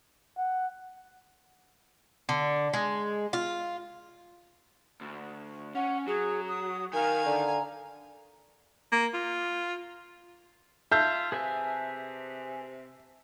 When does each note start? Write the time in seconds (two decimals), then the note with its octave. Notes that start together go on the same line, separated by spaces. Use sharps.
0.37 F#5
2.29 D3
2.73 G#3
3.33 F4
5.01 D2
5.75 C#4 F#5
6.07 F#3 G#4
6.48 D#6
6.93 D#3 A#4 F5 G#5
7.26 D3 A#5
8.92 A#3
9.14 F4
10.92 F4 E5 A5 E6 G6
11.32 C3 G#4 B4 G#5